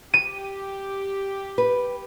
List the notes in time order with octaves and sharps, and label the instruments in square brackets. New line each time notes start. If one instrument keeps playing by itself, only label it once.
[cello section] G4 [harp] D#7
[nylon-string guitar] B4